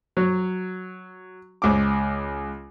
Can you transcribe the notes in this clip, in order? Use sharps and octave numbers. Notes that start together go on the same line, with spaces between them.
F#3
C#2 D6